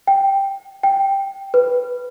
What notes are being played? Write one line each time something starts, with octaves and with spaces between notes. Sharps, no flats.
G5
G5
B4